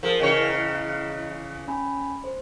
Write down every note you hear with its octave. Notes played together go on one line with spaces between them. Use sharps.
F3 G#4 A#4
E2 C#3 E4 C#5 D#5
C#4 G#5 B5
C5